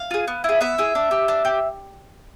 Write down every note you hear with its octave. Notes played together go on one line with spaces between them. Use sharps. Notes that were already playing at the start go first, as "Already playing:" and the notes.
Already playing: F5
F4 G#4
B3
E4 G#4
B3 E5
E4 G#4
D4
G4
D4
G4